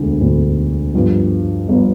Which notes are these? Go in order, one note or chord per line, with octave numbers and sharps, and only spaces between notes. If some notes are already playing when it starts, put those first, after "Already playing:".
Already playing: E1 D2 D3
E1 D2 D3
G1 G2 F3
G1 F3